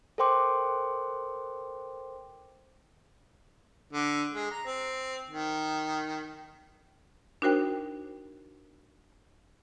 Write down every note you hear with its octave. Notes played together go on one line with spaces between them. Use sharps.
A4 A#4 C5 G5 C6 D6
D3
G#3
A#5
C4
D#3
D4 D#4 F#4 A#4 C5 G5